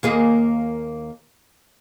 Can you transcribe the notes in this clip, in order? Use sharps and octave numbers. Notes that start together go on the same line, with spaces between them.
D#2 A#3 G#4